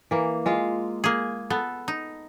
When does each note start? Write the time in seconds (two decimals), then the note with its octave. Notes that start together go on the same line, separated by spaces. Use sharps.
0.11 E3 A#3
0.46 G#3 F4 F5
1.04 A#3 G#4
1.50 B3 A4
1.88 D#4